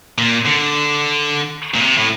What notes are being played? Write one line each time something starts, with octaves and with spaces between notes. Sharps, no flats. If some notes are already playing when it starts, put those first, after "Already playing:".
A#2
D3
A#2
C3
A2